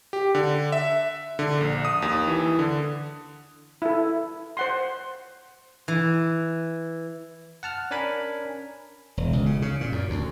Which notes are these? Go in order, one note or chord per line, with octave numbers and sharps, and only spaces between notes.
G4
D3
E5
D3
A#1
D#6
D#2
E3
D3
E4 A4
C5 F#5 C6
E3
F#5 A5 F6
C#4 D4 A#4 G#5 B5
E1
C#2
C#3
C#3
A#2
F#2
D2